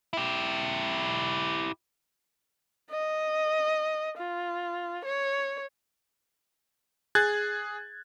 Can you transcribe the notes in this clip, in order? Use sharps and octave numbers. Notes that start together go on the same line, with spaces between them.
E4 G4
D#5
F4
C#5
G#4 F#6 G#6 A6